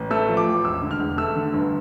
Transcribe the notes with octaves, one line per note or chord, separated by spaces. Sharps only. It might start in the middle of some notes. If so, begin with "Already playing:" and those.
Already playing: A1
A3 E6
F3
D6
A1
E1 E6
D3
F6
E1
A3 E6
D3
G1